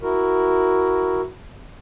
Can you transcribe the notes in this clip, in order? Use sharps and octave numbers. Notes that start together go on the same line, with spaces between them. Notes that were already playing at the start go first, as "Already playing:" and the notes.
E4 F#4 A#4